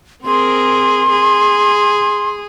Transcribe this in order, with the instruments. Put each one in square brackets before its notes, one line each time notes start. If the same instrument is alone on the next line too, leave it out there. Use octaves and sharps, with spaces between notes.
[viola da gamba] C4 G#4 A#4 [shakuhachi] C6
[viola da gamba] G#4